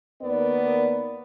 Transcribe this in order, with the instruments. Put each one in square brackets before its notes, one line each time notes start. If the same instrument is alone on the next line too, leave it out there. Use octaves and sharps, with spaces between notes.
[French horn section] D#2 A#3 B3 A#4 D5